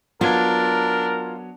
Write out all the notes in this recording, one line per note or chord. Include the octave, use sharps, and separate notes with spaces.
F#3 B3 D4 F4 A#4 G#6